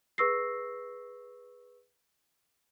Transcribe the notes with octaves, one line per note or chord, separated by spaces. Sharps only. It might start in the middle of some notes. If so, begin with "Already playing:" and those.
G#4 B4 C#6 E6 A#6 C7